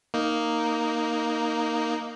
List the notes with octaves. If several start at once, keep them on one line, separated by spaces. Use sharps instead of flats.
A#3 D#4